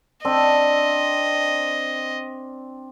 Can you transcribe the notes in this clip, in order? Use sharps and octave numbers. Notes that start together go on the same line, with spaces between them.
C4 D4 D#5